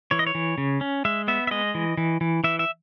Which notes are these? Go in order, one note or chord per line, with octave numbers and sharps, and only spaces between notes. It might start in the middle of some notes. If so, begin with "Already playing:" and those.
E3 C#5
D#5
C#5
E3
C#3
C#4
G#3 E5
B3 E5
E5
G#3 D#5
E3
E3
E3
E3 E5
E5